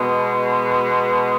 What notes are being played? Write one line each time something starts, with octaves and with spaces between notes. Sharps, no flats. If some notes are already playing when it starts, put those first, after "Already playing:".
Already playing: B2 G#3 B3